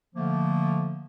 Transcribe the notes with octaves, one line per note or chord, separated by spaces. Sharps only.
D3 F3 A3 A#3